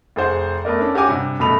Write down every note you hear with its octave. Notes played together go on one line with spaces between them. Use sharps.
F1 G#4 C5 F#5
A3 B3 A#4 D5
C#4 D4 A4
F#4 G4 C#5 F#5 G#5 D6
G2 C3
F#1 B2 A3 B5 F7